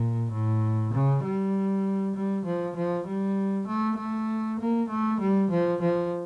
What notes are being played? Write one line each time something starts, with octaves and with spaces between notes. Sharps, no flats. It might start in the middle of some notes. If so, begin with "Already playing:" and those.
Already playing: A#2
A2
C#3
G3
G3
F3
F3
G3
A3
A3
A#3
A3
G3
F3
F3